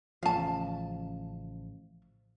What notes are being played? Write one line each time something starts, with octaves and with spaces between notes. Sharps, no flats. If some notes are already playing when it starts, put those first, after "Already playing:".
A1 C#3 F3 F5 A5